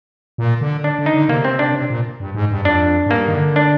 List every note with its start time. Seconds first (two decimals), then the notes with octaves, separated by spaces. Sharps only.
0.38 A#2
0.61 D3
0.84 D4
0.99 D3
1.06 D#4
1.14 D3
1.29 C3 A#3
1.45 C4
1.59 D4
1.74 C3
1.90 A#2
2.20 G2
2.35 G#2
2.51 G2
2.65 F2 D4
3.06 G#2
3.11 G2 A#3
3.28 D#3
3.34 D3
3.56 D4